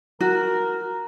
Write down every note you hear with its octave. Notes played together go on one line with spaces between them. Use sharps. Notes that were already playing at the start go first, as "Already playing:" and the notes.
F#4 A#4